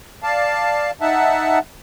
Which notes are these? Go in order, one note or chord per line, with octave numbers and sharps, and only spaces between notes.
D5 F5 A5
D#4 E5 F#5 A5